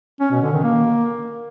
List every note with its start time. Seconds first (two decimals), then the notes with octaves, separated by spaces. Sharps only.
0.20 C#4
0.31 B2
0.42 D3
0.52 D#3
0.63 A#3